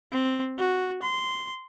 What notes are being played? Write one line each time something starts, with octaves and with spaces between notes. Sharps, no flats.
C4
F#4
C6